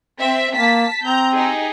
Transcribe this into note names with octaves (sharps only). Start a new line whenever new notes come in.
C4 E5
A#3 A5 B6
C4 A#5 G6
D#4 G4 G#4